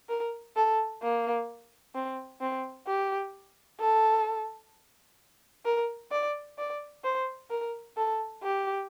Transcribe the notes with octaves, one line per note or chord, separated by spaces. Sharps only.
A#4
A4
A#3
C4
C4
G4
A4
A#4
D5
D5
C5
A#4
A4
G4